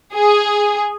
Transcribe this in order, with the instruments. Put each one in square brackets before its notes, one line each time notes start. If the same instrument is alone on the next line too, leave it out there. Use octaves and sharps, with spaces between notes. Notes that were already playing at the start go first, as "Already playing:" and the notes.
[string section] G#4